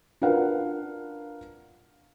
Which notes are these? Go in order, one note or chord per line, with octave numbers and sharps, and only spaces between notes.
D4 F4 A#4 B4 F5 F#5